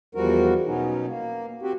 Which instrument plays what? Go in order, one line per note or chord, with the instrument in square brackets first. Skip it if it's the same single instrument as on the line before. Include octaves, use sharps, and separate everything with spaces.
[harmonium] E2 F3 G3 F#4 A#4
B2 F#3 B3 C#4 D#4
A#3
C4 F#4 G4